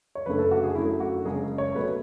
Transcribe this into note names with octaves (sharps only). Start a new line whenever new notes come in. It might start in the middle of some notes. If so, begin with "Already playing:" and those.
C#5
F#1 F#2 D3 A3 B4
A4
F#4
G#4
F#2 D3 F#3 A3 E4
F#4
F#1 F#2 C#3 G#3 G#4
C#5
B2 F#3 A3 B4
C#5